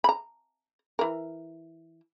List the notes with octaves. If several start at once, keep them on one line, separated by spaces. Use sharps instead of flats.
A#5 B5
E3 A#4